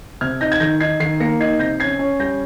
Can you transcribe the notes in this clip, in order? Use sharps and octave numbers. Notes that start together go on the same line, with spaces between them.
C3 F6 G#6
D#4 G6 A#6
G#6
D#3 G6 A#6
D#4 G#6 C7
D#3 G#6 C7
A#3 A#6 C#7
D#4 G#6 C7
C3 G6 A#6
C#4 G#6 C7
C#4
G3 G6 A#6